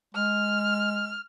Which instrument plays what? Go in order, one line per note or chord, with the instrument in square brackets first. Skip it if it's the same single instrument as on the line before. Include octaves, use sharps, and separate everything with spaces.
[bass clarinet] G#3 [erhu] F6